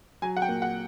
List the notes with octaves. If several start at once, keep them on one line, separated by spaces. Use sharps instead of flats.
F#3 G#5
F#5
G5
A#2
F#5